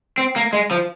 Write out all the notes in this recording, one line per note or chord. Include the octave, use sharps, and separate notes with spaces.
C4
A#3
G#3
F3